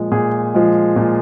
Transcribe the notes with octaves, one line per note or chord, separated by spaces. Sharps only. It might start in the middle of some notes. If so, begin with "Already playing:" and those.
Already playing: A#2 F3 G#3
A#2 G#4
F3 G#3
A#2